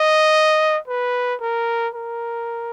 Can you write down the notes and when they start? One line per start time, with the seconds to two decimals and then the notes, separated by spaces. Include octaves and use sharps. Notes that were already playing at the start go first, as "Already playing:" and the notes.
Already playing: D#5
0.88 B4
1.41 A#4
1.94 A#4